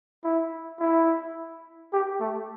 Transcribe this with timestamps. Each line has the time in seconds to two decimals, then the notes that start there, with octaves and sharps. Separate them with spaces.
0.24 E4
0.79 E4
1.93 G4
2.20 A3